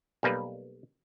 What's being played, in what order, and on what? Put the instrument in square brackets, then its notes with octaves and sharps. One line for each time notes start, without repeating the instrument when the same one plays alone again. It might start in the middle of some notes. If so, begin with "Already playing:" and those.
[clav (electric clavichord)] B1 G3 A#3 B4